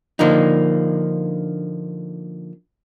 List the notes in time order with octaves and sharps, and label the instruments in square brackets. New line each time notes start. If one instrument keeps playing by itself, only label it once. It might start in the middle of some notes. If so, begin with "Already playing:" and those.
[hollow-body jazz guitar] D3 F3 A#3 D4 D#4